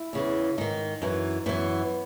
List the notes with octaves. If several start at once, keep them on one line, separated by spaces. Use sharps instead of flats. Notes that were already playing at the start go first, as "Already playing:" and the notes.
Already playing: E4
E2 C#3 E3
G#2 D#3 D#4
F#2 E3
F#2 E3 B3